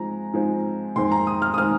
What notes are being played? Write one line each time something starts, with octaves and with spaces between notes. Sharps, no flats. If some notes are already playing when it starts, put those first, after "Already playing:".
Already playing: G#2 F3 G#3 C4 A#5
G#2 F3 G#3 C4
F2 D#3 G#3 C4 C6
A#5
D#6
F6
D#6
D#3 G#3 C4 F6